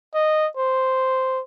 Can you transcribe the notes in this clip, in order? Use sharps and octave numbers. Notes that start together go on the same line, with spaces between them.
D#5
C5